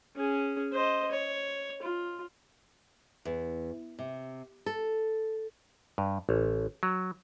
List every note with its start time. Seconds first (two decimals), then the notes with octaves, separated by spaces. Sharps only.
0.16 C#4 G#4
0.73 C5 D#5
1.12 C#5
1.82 F4
3.25 E2
3.99 C3
4.66 A4
5.98 G2
6.29 A1
6.83 F#3